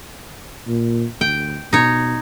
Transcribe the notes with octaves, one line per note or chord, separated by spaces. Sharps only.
A#2
D2 G5
B2 D#4 C#5